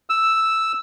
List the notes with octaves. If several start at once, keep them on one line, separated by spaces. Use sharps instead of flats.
E6